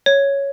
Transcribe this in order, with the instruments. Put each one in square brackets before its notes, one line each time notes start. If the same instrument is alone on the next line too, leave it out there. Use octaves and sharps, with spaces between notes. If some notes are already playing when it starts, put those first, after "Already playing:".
[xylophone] C#5